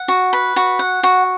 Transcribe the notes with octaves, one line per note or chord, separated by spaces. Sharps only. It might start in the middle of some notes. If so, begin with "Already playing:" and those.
Already playing: F#5
F#4
B4
F#4
F#5
F#4